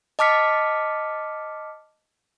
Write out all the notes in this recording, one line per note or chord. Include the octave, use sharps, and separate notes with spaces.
D#5 A5 D6 F6 B6 C#7